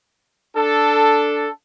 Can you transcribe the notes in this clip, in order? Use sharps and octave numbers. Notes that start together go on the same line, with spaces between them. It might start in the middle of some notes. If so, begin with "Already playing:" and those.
D4 A4